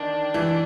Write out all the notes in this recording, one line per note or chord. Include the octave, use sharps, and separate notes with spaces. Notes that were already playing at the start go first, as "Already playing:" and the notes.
Already playing: D#3 D4
E3